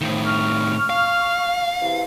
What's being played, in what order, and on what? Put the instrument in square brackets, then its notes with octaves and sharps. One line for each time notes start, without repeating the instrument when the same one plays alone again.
[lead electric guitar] A2 D#3 [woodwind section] F3
[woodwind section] C#6 F6
[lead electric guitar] F5
[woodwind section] E2 C3 E3